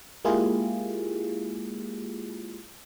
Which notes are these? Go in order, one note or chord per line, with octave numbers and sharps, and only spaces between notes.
G#3 A#3 E4 F4 G4 G#4